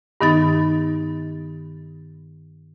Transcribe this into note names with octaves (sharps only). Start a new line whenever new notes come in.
G2 D#3 B3 D#4 A6